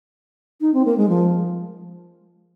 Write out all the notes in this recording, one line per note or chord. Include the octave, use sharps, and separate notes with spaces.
D#4
C4
A#3
G#3
F3